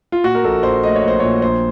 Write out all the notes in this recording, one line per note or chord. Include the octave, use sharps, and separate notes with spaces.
F4
A#2 F#4
A#4
A#1 A4
A#1 C5
A3 D#5
C#5
A#1 C5
A#2 C#5
A#1 C5